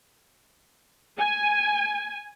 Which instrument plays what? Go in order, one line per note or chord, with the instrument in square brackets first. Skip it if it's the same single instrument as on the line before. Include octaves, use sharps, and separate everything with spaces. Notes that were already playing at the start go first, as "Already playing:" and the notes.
[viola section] G#5